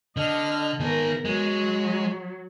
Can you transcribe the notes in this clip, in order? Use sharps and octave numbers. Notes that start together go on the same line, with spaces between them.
D3 D#5 A5 F6
D#3 B3 G#4 A#4
F#3 G#3